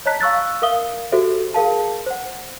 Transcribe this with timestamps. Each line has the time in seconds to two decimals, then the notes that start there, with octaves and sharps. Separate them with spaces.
0.06 C#5 D#5 A5 A#5 F#6 B6
0.21 F5 C#6 E6 F#6 A6
0.62 A#4 E5 F5 D#6 G7
1.12 F#4 G4 A4 C5 E5
1.54 G#4 A#4 F5 A5
2.06 C5 F#5